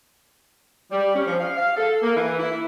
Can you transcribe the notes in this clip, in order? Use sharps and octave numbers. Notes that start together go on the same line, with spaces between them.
G3
C#4
F3
F5
F5
A4
A#3
E3
E4